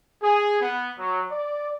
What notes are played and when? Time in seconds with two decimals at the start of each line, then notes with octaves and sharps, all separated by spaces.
0.22 G#4
0.61 B3
0.98 F#3
1.31 D5